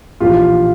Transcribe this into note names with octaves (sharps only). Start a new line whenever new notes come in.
A#1 A2 E3 F4 G4